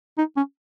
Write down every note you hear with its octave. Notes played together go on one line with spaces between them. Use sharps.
D#4
C#4